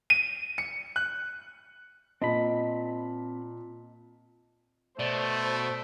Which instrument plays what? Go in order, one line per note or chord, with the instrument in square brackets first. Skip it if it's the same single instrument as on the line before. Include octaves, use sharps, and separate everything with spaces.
[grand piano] D#7
C#7
F#6
[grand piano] A#2 A5 [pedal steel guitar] C4 B5 [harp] D#5
[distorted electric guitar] B2 [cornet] A3 [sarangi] C5 [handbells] D5 A6